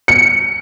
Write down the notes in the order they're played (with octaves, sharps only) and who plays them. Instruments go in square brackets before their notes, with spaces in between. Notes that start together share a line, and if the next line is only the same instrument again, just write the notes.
[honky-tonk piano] C#7